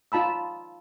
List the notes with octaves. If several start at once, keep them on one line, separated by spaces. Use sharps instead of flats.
D#4 F4 A5 B5 E6